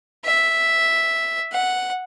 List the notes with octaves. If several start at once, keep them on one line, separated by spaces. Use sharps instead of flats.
E5
F#5